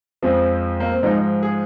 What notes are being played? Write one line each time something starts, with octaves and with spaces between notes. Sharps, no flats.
F2 F3 G#3 C4
A#3
C4
G#2 F3 G#3 D#4
G#4